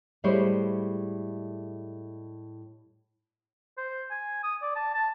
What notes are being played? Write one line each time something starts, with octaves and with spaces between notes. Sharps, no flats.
A2 G3 G#3 E4 C5 C#5
C5
G#5
D#6
D5
A5
A5